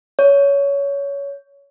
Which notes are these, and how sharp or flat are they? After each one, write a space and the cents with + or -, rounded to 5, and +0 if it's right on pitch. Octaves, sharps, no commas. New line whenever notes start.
C#5 +20